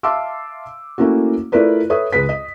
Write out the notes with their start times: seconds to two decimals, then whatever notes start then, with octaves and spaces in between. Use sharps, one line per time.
0.03 E5 F5 A5 C6 D6 E6
0.98 A3 A#3 C#4 E4 F#4
1.52 A3 E4 F4 A#4 B4 D5
1.90 A4 B4 C#5 E5 D#6
2.13 C#2 G#3 B4 B6
2.29 D#5